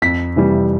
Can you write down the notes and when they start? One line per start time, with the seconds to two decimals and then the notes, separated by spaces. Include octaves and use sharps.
0.02 F2 B6
0.36 C3 E3 G3